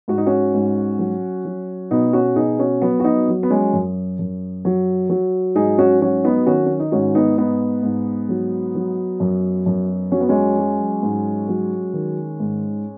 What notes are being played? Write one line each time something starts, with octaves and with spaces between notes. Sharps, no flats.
G#2 F#4
D#4
C#4 F#4
G#2
F#3
F#3
B2 B3 D#4
C#4 F#4
B2 D#4 G#4
C#4 F#4
F#3 B3
F#4
B3 D#4
F#3
B3
G#3 C#4
F#2
F#2
F#3
F#3
G#2 D#4 G#4
C#4 F#4
F#3 C#4 F#4
B3 D#4
D#3 C#4 F#4
C#4
D#4
G#2 C#4 F#4
B3 D#4
G#2 B3 D#4
G#2
F#3
F#3
F#2
F#2
F#3 C#4
B3
G#3 C#4
F#3
G#2
F#3
D#3
G#2